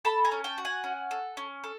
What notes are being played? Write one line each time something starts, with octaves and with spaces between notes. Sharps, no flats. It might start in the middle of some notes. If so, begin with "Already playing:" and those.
A4 A5 B5
G#5 A#5
C#4
G5 A5
F#4
F#5 G#5
C#4
A4
C#4
A4